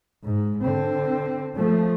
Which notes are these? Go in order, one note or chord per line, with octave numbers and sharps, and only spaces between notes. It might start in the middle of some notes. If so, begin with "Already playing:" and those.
G#2
D3 C4
F3 A3